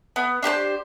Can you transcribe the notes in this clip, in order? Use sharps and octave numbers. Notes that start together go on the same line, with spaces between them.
B3
D4 G4 B4 C5